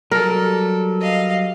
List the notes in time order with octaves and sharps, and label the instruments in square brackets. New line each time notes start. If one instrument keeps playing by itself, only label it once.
[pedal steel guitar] F#3 G3 [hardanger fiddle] A4 [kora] A#4
[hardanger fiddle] D#5 F5